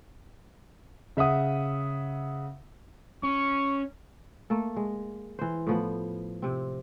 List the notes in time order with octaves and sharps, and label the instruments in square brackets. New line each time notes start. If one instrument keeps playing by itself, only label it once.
[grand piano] C#3 E5 F#5 D#6
[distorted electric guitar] C#4 [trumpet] C#6
[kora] A3 A#3 A4
G#3
E3 C5
A2 F3 B3
C3 C4